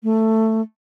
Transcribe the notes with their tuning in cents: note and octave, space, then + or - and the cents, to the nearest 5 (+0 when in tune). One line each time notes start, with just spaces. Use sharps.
A3 +10